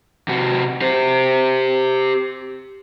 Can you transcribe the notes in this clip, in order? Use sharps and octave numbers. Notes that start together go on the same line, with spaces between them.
C3 F#4
G4 C5